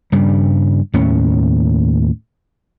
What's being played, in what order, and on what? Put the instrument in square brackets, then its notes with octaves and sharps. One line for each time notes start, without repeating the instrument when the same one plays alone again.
[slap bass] G2 C#3 G3
D#2 A2 C#4